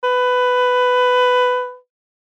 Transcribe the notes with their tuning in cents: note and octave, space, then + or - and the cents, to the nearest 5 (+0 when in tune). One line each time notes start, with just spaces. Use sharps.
B4 +15